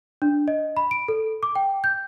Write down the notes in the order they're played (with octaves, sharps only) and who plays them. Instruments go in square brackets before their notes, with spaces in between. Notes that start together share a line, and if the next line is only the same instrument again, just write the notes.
[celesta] D4
D#5
B5
D7
A4
D6
G5
G6